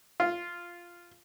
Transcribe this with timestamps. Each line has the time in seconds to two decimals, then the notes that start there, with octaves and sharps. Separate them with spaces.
0.20 F4